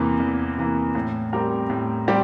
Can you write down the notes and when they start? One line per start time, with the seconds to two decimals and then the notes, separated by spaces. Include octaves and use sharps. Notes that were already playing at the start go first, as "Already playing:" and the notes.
Already playing: E2 C3 E3 A#3
0.20 E2
0.58 C3 E3 A#3
0.95 A2
1.33 G3 C4 G4 A#4
1.70 A2
2.08 G3 C4 G4